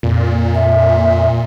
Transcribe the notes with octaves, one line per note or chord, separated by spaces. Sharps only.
F2 A#2
E5